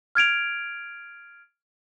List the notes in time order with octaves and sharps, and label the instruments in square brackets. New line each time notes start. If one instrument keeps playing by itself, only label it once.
[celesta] F6 G#6 D7 F7